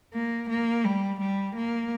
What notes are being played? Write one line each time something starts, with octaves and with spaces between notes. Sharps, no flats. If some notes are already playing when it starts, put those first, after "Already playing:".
A#3
A#3
G3
G3
A#3